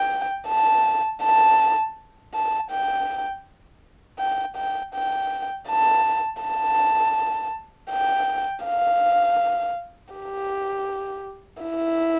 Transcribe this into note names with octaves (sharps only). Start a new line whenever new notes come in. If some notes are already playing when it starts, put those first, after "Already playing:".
Already playing: G5
A5
A5
A5
G5
G5
G5
G5
A5
A5
G5
F5
G4
E4